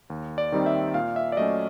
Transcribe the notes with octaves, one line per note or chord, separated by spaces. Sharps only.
D#2
D5
D#3 G3 C4 D#4
E5
A#2 F5
E5
D5
F#3 A3 C#4 D#5